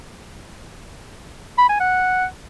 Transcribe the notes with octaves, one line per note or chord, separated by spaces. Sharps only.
B5
G#5
F#5